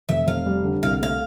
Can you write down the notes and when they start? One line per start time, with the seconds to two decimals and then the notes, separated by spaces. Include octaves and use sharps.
0.09 F1 E5
0.27 F1 F5
0.46 G3
0.64 D3
0.83 C2 F5
1.01 A3 F5